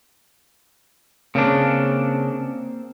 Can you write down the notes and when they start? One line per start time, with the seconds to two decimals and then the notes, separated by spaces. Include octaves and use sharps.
1.35 C#3 A#3 C4 D4